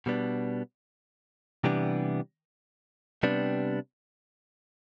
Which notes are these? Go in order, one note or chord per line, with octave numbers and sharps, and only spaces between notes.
B2 G3 B3 D4
C3 E3 G3 B3 D4
C3 G3 B3 D4